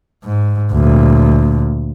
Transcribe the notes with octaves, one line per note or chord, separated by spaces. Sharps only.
G#2
D2 A#2